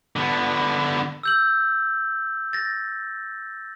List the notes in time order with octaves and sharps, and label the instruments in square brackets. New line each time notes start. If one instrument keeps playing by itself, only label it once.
[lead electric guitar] D3 B3
[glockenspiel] E6 G6 F#7
A6 A#6